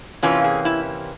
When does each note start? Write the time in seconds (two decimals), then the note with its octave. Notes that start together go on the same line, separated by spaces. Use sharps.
0.23 C3 E3 A#3 C#4 F4
0.44 G#4
0.65 E4